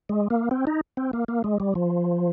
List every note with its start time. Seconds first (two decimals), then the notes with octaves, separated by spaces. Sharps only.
0.09 G#3
0.30 A#3
0.51 C4
0.67 D#4
0.97 C4
1.13 A#3
1.28 A#3
1.44 G#3
1.60 G3
1.75 F3